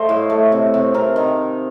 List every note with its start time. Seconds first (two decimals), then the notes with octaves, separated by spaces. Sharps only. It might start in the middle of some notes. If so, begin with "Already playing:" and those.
Already playing: A3 C5 D#5 F5
0.09 A2
0.30 A3
0.52 C3
0.74 C3
0.94 C3 A#4
1.16 D#3